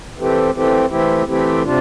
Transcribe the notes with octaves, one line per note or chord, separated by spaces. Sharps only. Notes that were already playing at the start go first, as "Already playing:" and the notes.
E3 A3 C4 G4
E3 A3 C4 G4
E3 A3 C4 E4 G4
E3 A3 C4 E4 G4
C3 G3 D4 F4